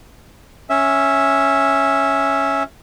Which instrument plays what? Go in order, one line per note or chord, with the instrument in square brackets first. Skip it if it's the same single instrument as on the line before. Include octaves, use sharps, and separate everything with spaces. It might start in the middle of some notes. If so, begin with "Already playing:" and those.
[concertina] C#4 E5